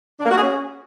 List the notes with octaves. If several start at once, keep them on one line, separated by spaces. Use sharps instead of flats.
D4
A#3
F#4
G#4
C#4